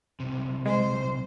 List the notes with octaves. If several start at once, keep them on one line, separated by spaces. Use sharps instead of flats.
B1 C3
G#3 C5